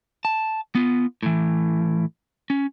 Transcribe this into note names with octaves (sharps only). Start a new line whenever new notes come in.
A5
B3 F4
A2 E3
C#4